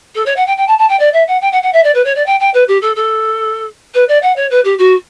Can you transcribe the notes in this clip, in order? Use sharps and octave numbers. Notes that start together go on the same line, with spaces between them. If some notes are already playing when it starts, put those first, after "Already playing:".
A4
C#5
F#5
G5
G5
A5
A5
G5
D5
E5
F#5
G5
F#5
F#5
E5
D5
B4
C#5
D5
G5
G5
B4
G4
A4
A4
B4
D5
F#5
C#5
B4
G4
F#4